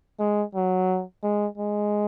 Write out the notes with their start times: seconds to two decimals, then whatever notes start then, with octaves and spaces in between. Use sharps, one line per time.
0.20 G#3
0.55 F#3
1.23 G#3
1.58 G#3